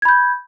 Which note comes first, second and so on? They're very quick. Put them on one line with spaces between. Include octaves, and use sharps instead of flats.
G#6 B5 G6